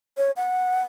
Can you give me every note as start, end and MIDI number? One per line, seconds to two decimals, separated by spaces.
0.17 0.31 73
0.36 0.82 78